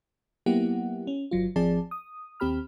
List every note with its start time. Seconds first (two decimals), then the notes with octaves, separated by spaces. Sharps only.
0.46 F#3 A#3 B3 E4 G4 F#5
1.07 C#4
1.31 G1 F#3 F4
1.56 G#1 F3 C4 G#4 D5 A5
1.91 D#6
2.40 D#2 C4 G4 B5 F6